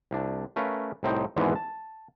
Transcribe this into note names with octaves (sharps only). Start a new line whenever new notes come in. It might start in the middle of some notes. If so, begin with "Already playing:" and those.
C2 D4
A3 C#4 A#4 B4 F5
C2 A2 C4 D#4 G5
G#1 E2 G#2 D3 E3 B3
A5